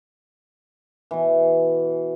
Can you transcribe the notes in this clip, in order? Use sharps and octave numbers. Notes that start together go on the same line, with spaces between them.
B2 E3